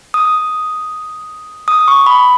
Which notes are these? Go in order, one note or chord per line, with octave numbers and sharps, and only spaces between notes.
D#6
D#6
C#6
B5